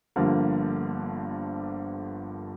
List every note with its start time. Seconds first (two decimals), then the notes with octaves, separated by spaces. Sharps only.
0.16 G1 G2 D3 F3 A#3